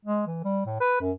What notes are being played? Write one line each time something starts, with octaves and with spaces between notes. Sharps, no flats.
G#3
E3
G3
A2
B4
F#2